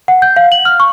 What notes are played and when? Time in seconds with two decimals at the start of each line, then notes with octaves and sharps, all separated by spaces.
0.08 F#5
0.22 G6
0.36 F5
0.52 F#7
0.65 F6
0.80 C#6